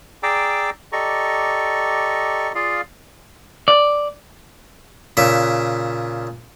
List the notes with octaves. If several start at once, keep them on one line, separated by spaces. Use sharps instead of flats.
G#4 D5 G5 A#5 D6 E6
G4 A4 D5 D#5 A#5 C#6
F4 G#4 D5 F5
D5
A#2 C#3 E5